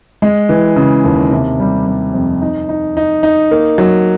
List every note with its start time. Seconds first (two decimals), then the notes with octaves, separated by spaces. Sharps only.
0.22 G#3
0.49 E3
0.76 C#3
1.04 D#2
1.31 C3
1.60 G3
1.86 G3
2.14 F2
2.42 D#4
2.69 D#4
2.97 D#4
3.23 D#4
3.51 A#3
3.78 F#3